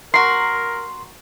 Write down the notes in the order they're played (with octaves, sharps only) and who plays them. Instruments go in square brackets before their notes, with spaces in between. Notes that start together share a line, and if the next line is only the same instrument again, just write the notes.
[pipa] A#3 F#4 [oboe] A#4 [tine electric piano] C6 [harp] C7